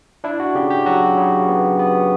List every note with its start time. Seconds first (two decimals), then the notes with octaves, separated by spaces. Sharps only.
0.24 D4 E4
0.40 F#4
0.55 C#3 G4
0.71 G4
0.86 F#3 F#4
1.17 C#3
1.48 B3
1.79 B3